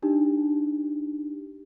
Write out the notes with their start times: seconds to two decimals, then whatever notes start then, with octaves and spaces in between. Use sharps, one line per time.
0.02 D4 D#4 G4